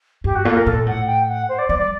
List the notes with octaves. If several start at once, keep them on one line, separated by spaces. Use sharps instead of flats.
G2 G4
F#4
A#2 A4
A#4
A#2 A4
A2 F#5
G5
F#5
C5
D5
G3 D5
D5